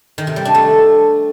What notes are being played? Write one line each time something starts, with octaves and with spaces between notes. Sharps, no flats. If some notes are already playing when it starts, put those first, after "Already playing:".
D#3
C3
G3
D4
A3